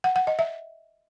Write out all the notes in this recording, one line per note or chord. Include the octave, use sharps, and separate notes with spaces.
F#5
F#5
D#5
E5